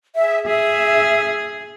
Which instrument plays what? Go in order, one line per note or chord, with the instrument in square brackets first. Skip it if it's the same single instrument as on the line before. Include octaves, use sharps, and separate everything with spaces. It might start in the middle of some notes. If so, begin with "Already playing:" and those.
[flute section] G#4 E5
[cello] G#4 [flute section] E5